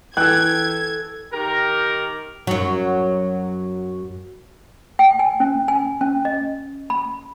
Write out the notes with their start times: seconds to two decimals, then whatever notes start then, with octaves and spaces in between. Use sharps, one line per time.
0.17 E3 A4 G5 F#6 G#6
1.33 D#3 D#4 G4 A#4
2.47 F#2 F#3
4.99 G5
5.19 G#5
5.40 C#4
5.68 G#5
6.01 C#4
6.25 D#5
6.90 B5